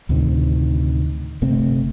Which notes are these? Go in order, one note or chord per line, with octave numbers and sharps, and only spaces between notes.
D2 A2 C3 D#3
G1 C3 A3 C4